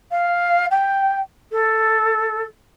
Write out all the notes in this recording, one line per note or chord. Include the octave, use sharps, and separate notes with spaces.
F5
G5
A4